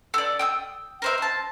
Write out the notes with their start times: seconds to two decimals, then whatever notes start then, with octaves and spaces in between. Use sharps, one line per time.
0.14 A4 D5
0.39 G5 D#6 E6
1.02 A#4 C5 E5
1.18 C5 A5